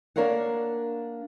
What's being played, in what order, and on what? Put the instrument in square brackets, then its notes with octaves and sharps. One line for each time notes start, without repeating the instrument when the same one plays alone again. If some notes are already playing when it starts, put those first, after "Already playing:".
[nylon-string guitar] A#3 D4 A#4 C#5 F5 F#5